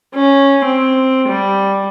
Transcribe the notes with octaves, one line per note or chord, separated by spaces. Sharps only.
C#4
C4
G3